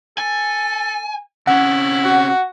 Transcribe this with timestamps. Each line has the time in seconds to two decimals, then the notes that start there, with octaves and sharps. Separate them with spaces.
0.18 A4 G#5
1.47 C3 C#4 E4 F#5
2.04 F#4